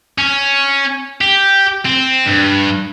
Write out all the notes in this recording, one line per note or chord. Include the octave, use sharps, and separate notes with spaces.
C#4
G4
C4
G2